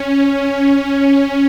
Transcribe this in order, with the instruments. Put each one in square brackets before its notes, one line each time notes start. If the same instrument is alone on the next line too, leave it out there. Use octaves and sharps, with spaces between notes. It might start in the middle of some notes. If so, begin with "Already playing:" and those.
Already playing: [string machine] C#4